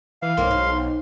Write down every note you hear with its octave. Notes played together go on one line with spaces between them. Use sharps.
E3 F5
B1 A#3 C4 C#4 C6
D#4